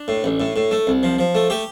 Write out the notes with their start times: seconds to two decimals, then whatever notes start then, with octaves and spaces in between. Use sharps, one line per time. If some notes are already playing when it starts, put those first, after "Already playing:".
Already playing: D4
0.08 A2
0.24 A1
0.40 A2
0.56 A2
0.71 A3
0.87 C2
1.03 F3
1.19 F3
1.35 A3
1.50 A3 G4